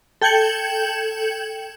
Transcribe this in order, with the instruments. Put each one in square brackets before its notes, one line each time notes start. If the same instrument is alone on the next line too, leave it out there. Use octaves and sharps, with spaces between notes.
[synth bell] A4 G5 G6 G#6 C#7 F#7